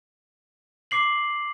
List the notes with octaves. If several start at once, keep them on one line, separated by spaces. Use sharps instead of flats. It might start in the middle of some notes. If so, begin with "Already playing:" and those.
D6 C7 F#7